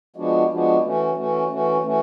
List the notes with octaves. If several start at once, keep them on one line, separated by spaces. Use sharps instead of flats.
F3 G#3 B3 D4 F#4
F3 G#3 B3 D4 F#4
E3 A3 C#4 F#4
E3 A3 C#4 F#4
E3 A3 C#4 F#4
E3 A3 C#4 F#4